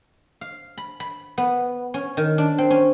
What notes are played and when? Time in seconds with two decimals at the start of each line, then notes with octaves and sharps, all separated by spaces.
0.41 F5
0.78 B5
1.00 B5
1.38 B3
1.94 C#4
2.17 D#3
2.38 D4
2.58 C4
2.71 C#4